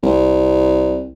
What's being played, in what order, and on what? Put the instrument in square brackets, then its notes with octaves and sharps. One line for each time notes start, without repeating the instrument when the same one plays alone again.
[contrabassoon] C2